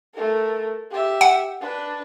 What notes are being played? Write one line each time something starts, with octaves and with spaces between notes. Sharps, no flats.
A3 A#4
G4 E5
F#5
D4 B4